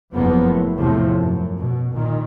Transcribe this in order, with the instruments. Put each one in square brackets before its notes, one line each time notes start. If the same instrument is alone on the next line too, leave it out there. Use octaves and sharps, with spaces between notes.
[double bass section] F#1 F2 F3 A#3 B3
A2
E2 A2 C3 F3
F#2
B2
A#2 D#3